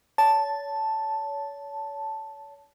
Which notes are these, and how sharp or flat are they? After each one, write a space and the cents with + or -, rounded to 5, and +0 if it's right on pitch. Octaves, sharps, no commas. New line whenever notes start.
C#5 +35 A5 +0